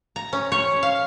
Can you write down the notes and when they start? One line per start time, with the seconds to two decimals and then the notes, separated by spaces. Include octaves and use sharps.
0.16 A#5
0.33 C#4
0.52 C#5
0.83 F5